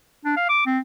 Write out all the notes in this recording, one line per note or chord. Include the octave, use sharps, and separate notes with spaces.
D4
F5
D6
C4